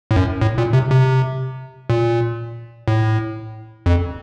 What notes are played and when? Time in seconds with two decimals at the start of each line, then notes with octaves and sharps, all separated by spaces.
0.11 A2
0.16 F#2
0.42 A2
0.58 A#2
0.73 C3
0.91 C3
1.90 A#2
2.88 A2
3.86 F2